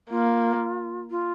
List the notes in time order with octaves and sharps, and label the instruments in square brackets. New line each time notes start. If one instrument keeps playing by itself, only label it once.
[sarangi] A#3 [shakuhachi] F4
[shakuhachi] F4